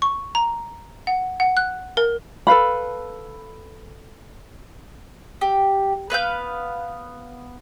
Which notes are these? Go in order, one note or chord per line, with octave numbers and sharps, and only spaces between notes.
C#6
A#5
F#5
F#5
F#6
A#4
A4 B4 F5 B5
G4
B3 B4 F5 G6